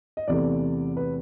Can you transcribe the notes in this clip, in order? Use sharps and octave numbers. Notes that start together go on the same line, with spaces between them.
D#5
E2 C3 E3 A3 D5
B4